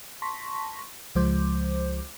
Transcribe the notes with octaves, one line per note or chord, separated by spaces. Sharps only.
A5 C6 C#6 A#6 B6
C#2 F3 G#3 C5 D6 G6